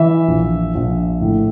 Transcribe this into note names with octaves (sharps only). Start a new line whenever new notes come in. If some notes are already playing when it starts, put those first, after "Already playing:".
Already playing: E3 E5
A#1
A#1
A2